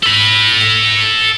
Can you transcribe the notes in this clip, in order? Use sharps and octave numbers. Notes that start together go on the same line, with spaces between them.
A4 B5